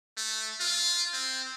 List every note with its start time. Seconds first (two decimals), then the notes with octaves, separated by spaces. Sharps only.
0.17 A3
0.60 F4
1.13 C4